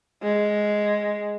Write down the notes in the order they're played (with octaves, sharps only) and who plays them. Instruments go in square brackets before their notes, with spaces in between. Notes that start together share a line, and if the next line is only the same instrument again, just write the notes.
[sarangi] G#3